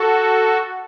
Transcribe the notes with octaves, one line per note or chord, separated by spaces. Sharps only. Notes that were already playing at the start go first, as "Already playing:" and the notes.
Already playing: F#4 A4